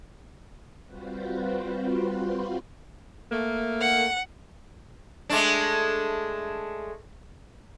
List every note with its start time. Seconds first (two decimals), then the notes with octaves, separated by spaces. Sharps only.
0.86 G3 C4 F4 F#4 B4 C5
3.31 A3 A#3
3.80 F#5
5.30 G#3 A3 D4